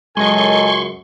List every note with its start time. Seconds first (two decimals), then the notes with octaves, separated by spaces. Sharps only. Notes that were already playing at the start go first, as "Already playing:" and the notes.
0.17 C#2 F#2 G#3 A4 D#5 G#5 C6 C#6